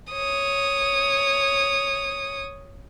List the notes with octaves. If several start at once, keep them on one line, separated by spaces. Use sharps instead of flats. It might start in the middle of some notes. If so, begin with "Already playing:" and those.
C#5 D#6